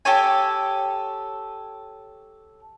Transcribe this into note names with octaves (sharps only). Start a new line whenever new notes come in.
G4 A4 C#5 G#5